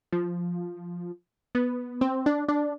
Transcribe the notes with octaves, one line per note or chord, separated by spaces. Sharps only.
F3
B3
C4
D4
D4